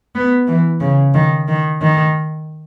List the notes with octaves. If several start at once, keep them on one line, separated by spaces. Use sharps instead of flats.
B3
E3
C#3
D#3
D#3
D#3